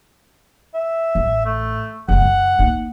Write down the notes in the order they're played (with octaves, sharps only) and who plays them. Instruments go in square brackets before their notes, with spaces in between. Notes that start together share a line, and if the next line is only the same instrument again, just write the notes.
[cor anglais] E5
[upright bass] A1
[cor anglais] A3
[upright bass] F#1 C#3 [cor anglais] F#5
[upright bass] F#2
A#3 D#4